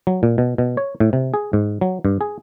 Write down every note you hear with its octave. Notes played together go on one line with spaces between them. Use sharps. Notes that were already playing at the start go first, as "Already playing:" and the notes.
F#3
A#2
B2
B2
C#5
A2
C3
G#4
G#2
F#3
G2
G#4